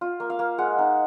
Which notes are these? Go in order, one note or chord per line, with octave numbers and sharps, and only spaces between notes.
F4
A#3
F5
A#3
G#3 F#5
D#4